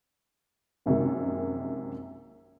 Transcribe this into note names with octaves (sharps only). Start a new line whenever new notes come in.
A#1 F#2 C3 D#3 G#3